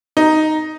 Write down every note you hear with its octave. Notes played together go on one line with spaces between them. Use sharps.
D#4